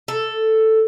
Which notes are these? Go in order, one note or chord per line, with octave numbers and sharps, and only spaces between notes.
A4